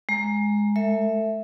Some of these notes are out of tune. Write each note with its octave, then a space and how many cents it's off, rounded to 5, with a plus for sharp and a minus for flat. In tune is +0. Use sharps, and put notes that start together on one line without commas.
G#3 +0 A#5 +0
A3 -35 A4 +40 E5 +0